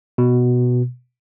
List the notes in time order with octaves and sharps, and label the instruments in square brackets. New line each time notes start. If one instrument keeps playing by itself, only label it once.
[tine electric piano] B2